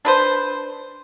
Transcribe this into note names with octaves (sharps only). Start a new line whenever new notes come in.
D4 B4 C5